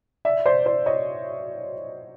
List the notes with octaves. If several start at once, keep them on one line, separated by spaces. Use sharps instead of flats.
D5 E5
C5 D5
C5 D5
C#5 D#5